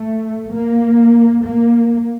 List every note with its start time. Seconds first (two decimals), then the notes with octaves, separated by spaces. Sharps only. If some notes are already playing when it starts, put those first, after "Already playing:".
Already playing: A3
0.53 A#3
1.44 A#3